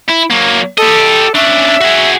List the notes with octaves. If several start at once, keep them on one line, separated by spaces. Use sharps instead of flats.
E4
F#3 A#3
G4 A4 D#5
C#4 D4 E5
F#4 G#4